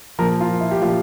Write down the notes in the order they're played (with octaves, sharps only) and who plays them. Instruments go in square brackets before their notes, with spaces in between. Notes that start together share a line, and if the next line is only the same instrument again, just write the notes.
[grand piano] A#2 F3 A#4
F4
E4
G4
A#2 F3 F4